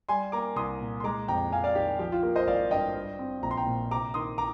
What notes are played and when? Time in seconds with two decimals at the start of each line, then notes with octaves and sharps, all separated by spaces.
0.09 G3 G#5 C6
0.32 A#3 A#5 D6
0.56 C2 C6 D#6
0.81 A#2
1.00 C6
1.04 G#3 A#5 D6
1.28 F2 G5 A#5
1.52 F2 F5 G#5
1.64 D5 F5
1.75 D#3 G4
1.99 F3 G4
2.12 F4
2.23 A#3 G4
2.36 C5 D#5
2.47 G#1 D5 F5
2.71 G2 D#5 G5
2.95 G3
3.19 C4
3.43 A#1 A#5
3.51 C6
3.57 G5 A#5
3.66 A#2
3.91 C3 A#5 D6
4.14 D#3 C6 D#6
4.38 A#5 D6